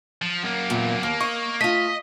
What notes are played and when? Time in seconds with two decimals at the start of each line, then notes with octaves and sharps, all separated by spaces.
0.22 F3
0.43 F#2 A#3
0.70 E2 A#2
1.03 D#2 A#3
1.21 D#5 C#6
1.61 A3 F4 D#5 B6